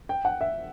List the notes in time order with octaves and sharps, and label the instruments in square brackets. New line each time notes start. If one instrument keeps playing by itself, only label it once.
[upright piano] G5
F#5
E5